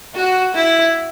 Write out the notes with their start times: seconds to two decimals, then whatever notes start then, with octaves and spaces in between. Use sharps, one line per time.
0.15 F#4
0.54 E4